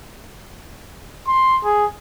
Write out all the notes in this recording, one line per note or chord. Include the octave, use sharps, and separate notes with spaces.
C6
G#4